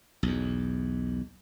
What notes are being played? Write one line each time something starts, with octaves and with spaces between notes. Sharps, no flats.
B1 E2